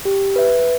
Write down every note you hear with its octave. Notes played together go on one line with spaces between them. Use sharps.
G4
B4 E5